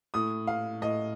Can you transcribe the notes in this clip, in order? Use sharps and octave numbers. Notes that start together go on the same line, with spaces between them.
A2 D#6
F5
A2 D#5